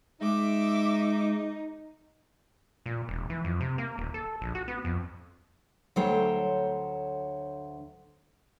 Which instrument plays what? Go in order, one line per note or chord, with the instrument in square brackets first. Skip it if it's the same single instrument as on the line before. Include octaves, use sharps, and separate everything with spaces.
[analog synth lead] G#3 [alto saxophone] D#4 [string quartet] E5 D6
[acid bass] A#2
E1
E3
F2
C3
A#3
D#1
A4
A#1
F#4
B3
F2
[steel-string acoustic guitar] D2 F#3 A4 C5 C#5 G5